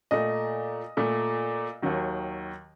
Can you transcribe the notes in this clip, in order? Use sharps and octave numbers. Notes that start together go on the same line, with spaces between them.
A#2 A3 D#5
A#2 A3
D#2 D#3 F#3